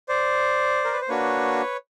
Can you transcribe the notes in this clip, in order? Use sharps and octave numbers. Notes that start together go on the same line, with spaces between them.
C5 D5
A#4
B4
C5
A#3 D4 F#4 B4 C#5